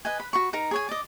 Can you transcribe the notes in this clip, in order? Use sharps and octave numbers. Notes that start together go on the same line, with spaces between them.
B4 D#5 G#5
B5
F#4 B5 C#6
D#4 A#4 A#5
G#4 C#5 G#5
D5 D#5